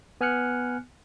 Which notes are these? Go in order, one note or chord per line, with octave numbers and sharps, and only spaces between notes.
B3 G#5 F6 F#6 C#7